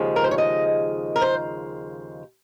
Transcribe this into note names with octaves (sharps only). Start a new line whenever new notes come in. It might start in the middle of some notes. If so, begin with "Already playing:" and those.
Already playing: D#2 C#3 F3 G#3
A#4
C5
C#5
D#5
A#4
C5